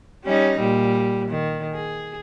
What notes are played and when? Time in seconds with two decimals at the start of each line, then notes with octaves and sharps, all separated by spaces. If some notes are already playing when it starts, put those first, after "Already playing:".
0.24 G3 C#4 D#4
0.59 A#2 G3
1.28 D#3
1.74 G#4